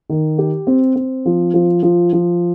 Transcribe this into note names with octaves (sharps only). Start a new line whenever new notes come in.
D#3
G4
C4
C4
F3
F3
F3
F3